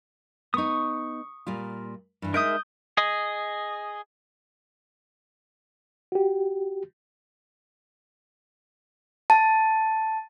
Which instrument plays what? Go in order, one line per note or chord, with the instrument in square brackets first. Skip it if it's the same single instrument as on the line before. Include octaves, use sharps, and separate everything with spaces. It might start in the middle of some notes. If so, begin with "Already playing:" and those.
[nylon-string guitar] B3 D#4 [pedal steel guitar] C#6 D#6
[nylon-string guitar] A#2 G3 F4
G2 E3
[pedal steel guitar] G#3 A#4 E5 [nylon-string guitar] D#4 [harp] D#6 G6 D7
[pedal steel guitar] G#4 D#5
[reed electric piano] F#4 G4
[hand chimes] A5